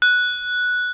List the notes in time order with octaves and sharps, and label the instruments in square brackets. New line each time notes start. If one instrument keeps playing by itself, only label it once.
[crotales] F#6